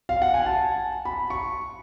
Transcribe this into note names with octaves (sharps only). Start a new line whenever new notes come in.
F5
F#5
G#5
A5
B5
C#6